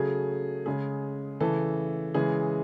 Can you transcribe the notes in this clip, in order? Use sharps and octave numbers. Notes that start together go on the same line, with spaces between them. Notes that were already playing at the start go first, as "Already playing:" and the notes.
Already playing: C#3 F#3 A3 G#4
C#3 G#3 G#4
C#3 E3 A3 A4
C#3 E3 G#3 G#4